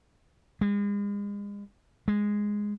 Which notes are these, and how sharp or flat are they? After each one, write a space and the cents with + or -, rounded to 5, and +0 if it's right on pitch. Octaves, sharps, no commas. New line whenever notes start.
G#3 -40
G#3 -5